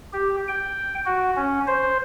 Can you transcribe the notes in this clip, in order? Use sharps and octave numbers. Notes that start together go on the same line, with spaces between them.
G4
G5
F#4
C#4
C5